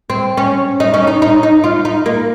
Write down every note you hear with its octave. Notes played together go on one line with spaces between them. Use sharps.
C4
C#4
D#4
C#4
D#4
D#4
D#4
F4
D#4
A#3